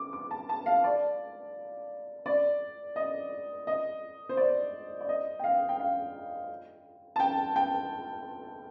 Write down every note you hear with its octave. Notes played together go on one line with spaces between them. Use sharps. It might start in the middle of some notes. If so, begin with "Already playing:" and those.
Already playing: D6
D6
A5
A5
F5
D5
D5
D#5
D#5
C5
D5
D5
D#5
G5
F5
G5
F5
A5
G5
G5